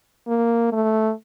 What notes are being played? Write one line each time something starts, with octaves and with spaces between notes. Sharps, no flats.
A#3
A3